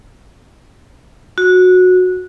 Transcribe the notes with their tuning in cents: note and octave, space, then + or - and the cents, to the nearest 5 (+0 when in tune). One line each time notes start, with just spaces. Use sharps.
F#4 -15